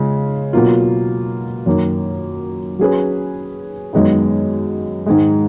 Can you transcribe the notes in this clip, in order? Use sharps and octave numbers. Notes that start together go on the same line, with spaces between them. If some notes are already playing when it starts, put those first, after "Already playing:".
Already playing: C#3 G#3 F4
B2 F#3 A#3 F4
F#2 D#3 A#3
F#3 C#4 G#4 B4
F#2 D#3 G#3 B3 D#4
G#2 D#3 G#3